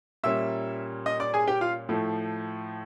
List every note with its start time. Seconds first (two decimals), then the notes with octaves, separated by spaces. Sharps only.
0.24 A#2 G3 A#3 C#4 E5 E6
1.06 D#5 D#6
1.20 D5 D6
1.34 G#4 G#5
1.47 G4 G5
1.61 F4 F5
1.89 A2 F3 A3